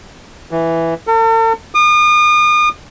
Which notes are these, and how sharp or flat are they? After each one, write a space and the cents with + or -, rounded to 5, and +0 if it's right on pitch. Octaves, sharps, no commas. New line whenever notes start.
E3 +0
A4 +45
D#6 -40